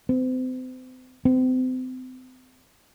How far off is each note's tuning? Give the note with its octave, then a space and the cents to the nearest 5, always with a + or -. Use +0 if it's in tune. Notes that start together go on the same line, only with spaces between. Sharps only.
C4 -35
C4 -35